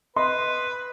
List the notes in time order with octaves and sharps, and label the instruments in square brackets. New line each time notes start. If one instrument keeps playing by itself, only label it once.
[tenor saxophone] B4 [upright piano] D#5 C6